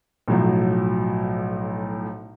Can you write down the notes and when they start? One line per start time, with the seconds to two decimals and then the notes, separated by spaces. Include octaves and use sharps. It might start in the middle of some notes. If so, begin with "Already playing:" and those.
0.28 B1 A2 F3 F#3